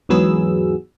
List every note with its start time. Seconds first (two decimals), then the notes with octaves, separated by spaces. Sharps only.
0.09 E2 G#2 F#3 B3 G#4 E6